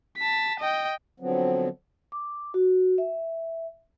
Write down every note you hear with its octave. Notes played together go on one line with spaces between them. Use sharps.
A5 B6
D#5 G5
D3 F3 F#3 B3 C4
D6
F#4
E5